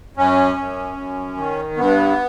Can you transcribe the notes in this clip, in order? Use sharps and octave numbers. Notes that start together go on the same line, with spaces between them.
F#2 C#4
F#2
F#2
D#3
G2 B3